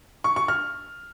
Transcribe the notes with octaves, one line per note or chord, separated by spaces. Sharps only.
C#6
C#6
F6